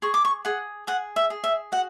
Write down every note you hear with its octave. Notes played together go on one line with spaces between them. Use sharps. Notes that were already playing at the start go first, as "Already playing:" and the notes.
G#4 C#6
D6
C#6
G#4 F#5
G#4 F#5
E5
G#4
E5
F#4 F#5